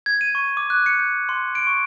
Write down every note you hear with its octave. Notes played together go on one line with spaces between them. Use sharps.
G#6
D#7
C#6
D6
F#6
C#7
G6
C6
D7
C#6